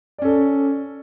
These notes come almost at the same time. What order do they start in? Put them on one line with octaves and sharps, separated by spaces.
D5 C#4 A4